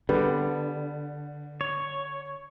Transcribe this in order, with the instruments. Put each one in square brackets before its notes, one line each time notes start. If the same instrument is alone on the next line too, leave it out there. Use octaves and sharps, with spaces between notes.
[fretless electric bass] D3 [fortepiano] G3 B3
[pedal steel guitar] C#5